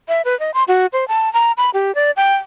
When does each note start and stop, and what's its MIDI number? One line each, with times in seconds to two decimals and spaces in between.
0.08 0.22 76
0.25 0.38 71
0.40 0.54 75
0.54 0.64 84
0.68 0.86 66
0.93 1.07 72
1.08 1.32 81
1.33 1.52 82
1.57 1.70 83
1.74 1.94 67
1.95 2.11 74
2.17 2.35 79